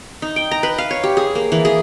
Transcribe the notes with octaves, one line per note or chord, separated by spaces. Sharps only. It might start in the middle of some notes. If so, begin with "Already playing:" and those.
D#4
G5
A#5
B4
F5
C#5
G4
G#4
A#3
E3
G#4